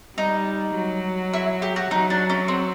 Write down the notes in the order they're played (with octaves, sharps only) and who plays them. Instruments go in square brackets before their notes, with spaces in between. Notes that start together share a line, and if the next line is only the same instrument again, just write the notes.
[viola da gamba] G3 [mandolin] D#4
[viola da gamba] F#3
[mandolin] E4
G4
F#4
[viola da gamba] F#3 [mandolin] D#4
[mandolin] D4
C#4
C4